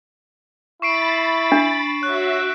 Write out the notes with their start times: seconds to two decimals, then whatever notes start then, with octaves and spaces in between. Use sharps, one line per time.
0.82 E4 B5 C#6 A6 C7 D7
1.52 D4
2.03 F#4 C#5 E5 F#6